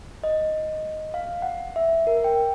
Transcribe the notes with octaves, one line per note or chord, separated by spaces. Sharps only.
D#5
F5
F#5
E5
A#4
G5